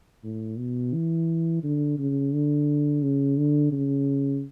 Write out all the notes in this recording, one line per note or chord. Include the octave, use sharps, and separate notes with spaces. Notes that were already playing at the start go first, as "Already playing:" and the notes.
A2
B2
E3
D3
C#3
D3
C#3
D3
C#3